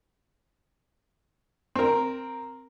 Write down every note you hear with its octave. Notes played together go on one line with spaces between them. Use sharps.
C4 A#4